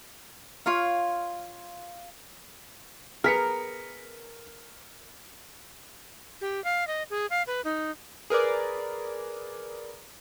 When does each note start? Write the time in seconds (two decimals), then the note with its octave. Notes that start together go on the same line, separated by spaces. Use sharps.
0.66 F4 C#5 F5
3.24 B3 G#4 A#4 F6 B6 C#7
6.41 G4
6.64 F5
6.87 D#5
7.10 G#4
7.30 F5
7.47 B4
7.65 D#4
8.30 G#4 A#4 B4 D5